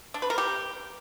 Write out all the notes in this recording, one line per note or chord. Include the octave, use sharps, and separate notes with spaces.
D4
B4
A#4
G4